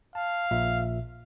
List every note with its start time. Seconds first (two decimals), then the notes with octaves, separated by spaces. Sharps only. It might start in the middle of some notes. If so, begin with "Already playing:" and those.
0.15 F5 A5
0.51 A#1 A#2 E5